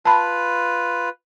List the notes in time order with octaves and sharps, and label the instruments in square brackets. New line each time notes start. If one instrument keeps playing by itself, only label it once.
[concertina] F4 B4 [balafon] A5 B5